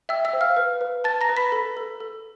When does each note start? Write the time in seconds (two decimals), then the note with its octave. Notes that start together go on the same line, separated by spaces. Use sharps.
0.09 E5 G5 E6
0.25 E5 E6
0.33 C5
0.41 F5 F6
0.57 B4
0.81 B4
1.04 B4 A5 A6
1.21 A#5 A#6
1.29 B4
1.37 B5 B6
1.52 A4
1.77 A4
2.00 A4